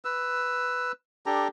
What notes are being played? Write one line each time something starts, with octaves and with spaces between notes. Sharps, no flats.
B4 E6
D4 G4 A4 A#5